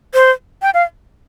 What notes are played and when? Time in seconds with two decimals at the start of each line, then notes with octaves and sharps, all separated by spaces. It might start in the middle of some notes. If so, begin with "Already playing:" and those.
0.14 C5
0.62 G5
0.74 F5